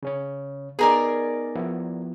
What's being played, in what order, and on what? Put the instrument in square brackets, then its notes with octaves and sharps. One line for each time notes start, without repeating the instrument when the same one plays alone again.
[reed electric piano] C#3 C#4 C#5
[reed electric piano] B3 D#4 G#5 [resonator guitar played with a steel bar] G#4 A#4 D5
[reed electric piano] F3 B3 E4